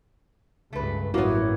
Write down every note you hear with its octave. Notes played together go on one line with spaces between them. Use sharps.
C#2 G2 A3 B4
A1 G2 F#3 A#3 B3 E4 C#5